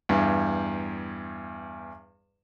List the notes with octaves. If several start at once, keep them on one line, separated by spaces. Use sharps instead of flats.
E2 G2